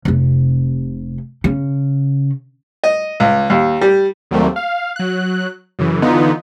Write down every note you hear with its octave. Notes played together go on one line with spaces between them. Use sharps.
F1 C3
C#3
D#5
C#2
D#2
G3
D#2 F#3 G3 A3 A#3 C4
F5
F#3 F#6
F#2 C#3 E3
D3 E3 B3 D#4 F4